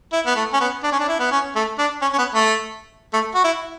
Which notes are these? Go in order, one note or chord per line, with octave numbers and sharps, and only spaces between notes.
E4
B3
A3
C#4
B3
D4
C#4
D4
E4
B3
C#4
A3
D4
C#4
C#4
B3
A3
A3
F#4
E4